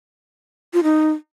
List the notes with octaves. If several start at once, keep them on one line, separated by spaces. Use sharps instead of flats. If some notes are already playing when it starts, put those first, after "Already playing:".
F4
D#4